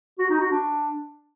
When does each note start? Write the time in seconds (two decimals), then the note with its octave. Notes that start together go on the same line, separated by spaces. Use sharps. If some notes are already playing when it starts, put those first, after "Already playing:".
0.19 F#4
0.30 D#4
0.40 F#4
0.51 D4